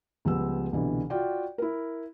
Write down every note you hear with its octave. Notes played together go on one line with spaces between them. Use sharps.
C#2 F3 G3 B3 E6
C2 B2 D3 E3
F4 F#4 D5 G5
E4 A#4